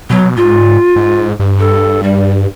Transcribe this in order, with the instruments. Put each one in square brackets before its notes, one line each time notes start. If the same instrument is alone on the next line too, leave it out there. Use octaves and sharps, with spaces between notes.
[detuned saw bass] B2 [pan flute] F#3
[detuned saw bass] G#2 [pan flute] F4
[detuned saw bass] G#2
G2
[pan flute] A4
G3